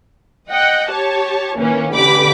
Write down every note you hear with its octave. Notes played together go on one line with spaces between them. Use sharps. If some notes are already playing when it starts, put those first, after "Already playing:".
D#5 F#5 G5
G4 C#5 A5
D#3 E3 A#3 C#4
A1 D3 G4 B5 D6 B6